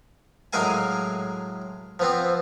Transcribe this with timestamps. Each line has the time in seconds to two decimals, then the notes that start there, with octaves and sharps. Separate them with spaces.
0.53 A2 F#3 G#3 A#4 F5 G#5
1.99 F3 B3 C4